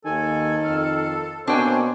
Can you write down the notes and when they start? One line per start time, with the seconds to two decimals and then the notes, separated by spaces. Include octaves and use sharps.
0.05 D#2 D#3 A4 G#5
0.64 F2 F5
1.47 B2 A#3 C4 D4 C5 C#5 G5 G#5